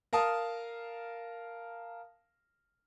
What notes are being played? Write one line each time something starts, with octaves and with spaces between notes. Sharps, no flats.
A#4 F5 A5 D#6